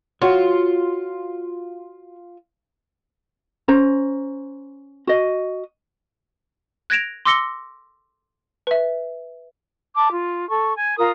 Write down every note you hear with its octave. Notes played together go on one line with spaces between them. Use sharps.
F4 F#4 C#5
C#4 C5 A#5
F#4 D#5
F#6 G#6 A#6 D7 E7 F7
C6 D6 E6 A#6 C#7 G7
B4 E5
A5 D6
F4
A4 C#6
G#5
F4 A#4 D#6